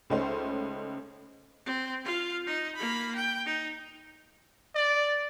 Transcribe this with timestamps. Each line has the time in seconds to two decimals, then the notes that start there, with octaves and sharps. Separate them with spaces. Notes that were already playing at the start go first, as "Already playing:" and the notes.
0.10 C#2 A3 C#4 D#4 C5
1.66 C4
2.04 F4 F5
2.47 D#4 D#5
2.75 A#3 B5
3.15 G5
3.46 D#4
4.75 D5